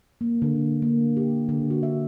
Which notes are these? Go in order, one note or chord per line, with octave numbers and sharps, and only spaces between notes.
A#3
D3
A#3
G4
D3
F#4
E5